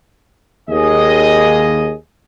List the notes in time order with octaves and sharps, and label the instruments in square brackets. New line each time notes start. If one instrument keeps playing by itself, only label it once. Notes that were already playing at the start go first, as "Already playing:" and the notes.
[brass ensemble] D#2 G#4 D#5